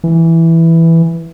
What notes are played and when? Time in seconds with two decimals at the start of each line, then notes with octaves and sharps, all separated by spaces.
0.04 E3